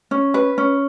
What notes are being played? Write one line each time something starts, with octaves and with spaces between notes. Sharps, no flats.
C#4
B4
C#4